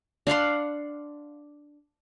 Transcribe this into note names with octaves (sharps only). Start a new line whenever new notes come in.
D4 F5 F#5 C6